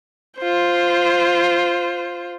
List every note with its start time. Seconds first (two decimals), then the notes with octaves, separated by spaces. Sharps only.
0.39 F4 C5